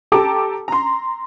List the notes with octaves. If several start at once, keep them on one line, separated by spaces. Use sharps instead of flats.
G4 A4 A5 A#5 D6
A#5 C6